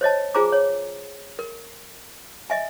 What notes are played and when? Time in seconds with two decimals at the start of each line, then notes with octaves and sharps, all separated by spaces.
0.01 C5 C#5 D#5 A5
0.34 F4 G#4 C5 G#5 A#5 D6
0.52 C#5
1.39 A#4
2.50 D#5 E5 G#5